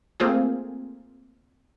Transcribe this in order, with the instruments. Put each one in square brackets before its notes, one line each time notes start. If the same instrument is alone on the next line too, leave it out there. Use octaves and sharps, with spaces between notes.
[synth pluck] A3 A#3 C4 F4 G#4